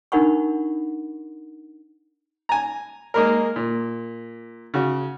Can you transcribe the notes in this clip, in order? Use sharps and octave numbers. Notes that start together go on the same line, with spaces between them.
D4 D#4 A#4 F#5 B5 C#6
G#5 A#5
G#3 A#3 A#4
A#2
C#3 F#4